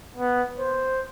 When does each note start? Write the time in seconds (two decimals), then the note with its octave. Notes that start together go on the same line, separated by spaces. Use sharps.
0.16 B3
0.59 C5